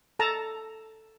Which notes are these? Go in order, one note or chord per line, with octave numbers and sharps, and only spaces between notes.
A4 A5 A#5